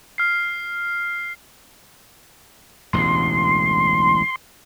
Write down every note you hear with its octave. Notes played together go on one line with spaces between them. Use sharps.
F6 C7
E1 A1 D2 C6